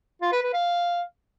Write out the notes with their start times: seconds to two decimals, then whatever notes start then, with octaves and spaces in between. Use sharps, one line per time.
0.22 F4
0.32 B4
0.43 B4
0.53 F5